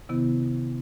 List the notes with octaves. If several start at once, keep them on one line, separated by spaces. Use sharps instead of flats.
C3 D#3 B3 E4